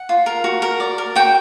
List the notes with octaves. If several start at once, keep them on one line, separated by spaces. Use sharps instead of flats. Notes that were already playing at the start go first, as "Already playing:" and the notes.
Already playing: F#5
F4
A#4
F#4
A#4
D5
A#4
F#4 G5